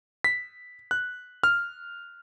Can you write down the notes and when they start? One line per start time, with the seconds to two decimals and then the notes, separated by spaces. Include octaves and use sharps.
0.24 B6
0.91 F#6
1.43 F6